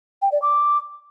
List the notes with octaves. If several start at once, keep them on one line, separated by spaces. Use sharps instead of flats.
G5
D5
D6